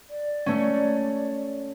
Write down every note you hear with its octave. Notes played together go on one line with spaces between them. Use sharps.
D5
A3 C#4